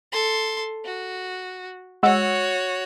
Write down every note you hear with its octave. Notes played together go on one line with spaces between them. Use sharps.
A4 C6
F#4
G#3 F#4 C#5 F#5 E6